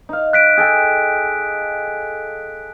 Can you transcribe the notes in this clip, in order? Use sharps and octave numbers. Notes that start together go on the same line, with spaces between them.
D#4 F5
F#6 B6 D7
G#4 A4 G5